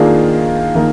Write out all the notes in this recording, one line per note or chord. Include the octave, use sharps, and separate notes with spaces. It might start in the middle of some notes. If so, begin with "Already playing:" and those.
Already playing: D#3 A#3 D4 F4 G#4
D#3 A#3